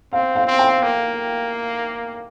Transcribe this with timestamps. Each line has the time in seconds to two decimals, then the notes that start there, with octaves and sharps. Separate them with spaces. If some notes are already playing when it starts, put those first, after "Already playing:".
0.13 C4 F5
0.35 F5
0.47 C4
0.59 G5
0.83 A#3